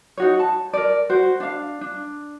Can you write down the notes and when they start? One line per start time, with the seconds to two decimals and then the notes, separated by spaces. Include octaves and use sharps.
0.17 D#4 F#4 C#5
0.39 A5
0.73 A#4 D5
1.10 F#4 C5
1.40 D4 F5
1.81 D4